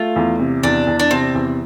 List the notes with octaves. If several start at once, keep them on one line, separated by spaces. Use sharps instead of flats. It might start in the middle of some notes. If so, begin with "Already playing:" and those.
Already playing: A3 F4
E2
C3
E2 D4
E2
D4
C3 C4
E2